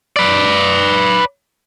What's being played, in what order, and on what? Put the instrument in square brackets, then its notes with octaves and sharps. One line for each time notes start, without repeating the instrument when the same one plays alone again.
[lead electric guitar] B4 D5